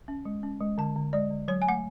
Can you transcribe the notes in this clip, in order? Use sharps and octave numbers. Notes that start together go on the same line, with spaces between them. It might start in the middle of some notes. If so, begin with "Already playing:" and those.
C#4
G#3
C#4
G#3
D3 A5
D3
G#3 D5
D3
F#3 C#5
G#5
A3 F#5